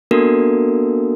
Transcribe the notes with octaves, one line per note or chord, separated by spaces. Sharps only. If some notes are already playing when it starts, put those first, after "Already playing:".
A#3 B3 D4 F#4 A4 A#4